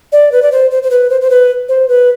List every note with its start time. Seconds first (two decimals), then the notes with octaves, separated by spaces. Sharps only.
0.12 D5
0.32 B4
0.42 D5
0.52 C5
0.71 C5
0.83 C5
0.91 B4
1.10 C5
1.21 C5
1.30 B4
1.69 C5
1.88 B4